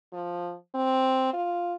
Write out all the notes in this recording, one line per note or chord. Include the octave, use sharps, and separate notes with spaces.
F3
C4
F4